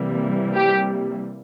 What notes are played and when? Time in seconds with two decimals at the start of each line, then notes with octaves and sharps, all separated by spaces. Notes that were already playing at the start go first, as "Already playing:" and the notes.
Already playing: C3 E3 G3 A#3
0.56 G4